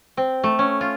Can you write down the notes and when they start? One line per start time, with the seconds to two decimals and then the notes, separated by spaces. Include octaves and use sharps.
0.17 C4
0.44 A3
0.59 C#4
0.81 F4